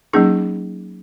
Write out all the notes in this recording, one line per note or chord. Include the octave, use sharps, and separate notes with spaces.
F#3 A#3 C#4 D#4 G#4